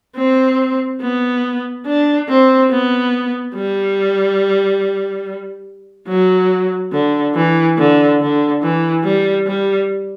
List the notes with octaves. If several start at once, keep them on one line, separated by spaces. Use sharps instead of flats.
C4
B3
D4
C4
B3
G3
F#3
D3
E3
D3
D3
E3
G3
G3